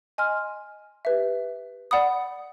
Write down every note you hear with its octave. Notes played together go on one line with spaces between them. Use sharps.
D#5 G#5 C6 F6
G4 B4 E5
D5 F#5 B5 D#6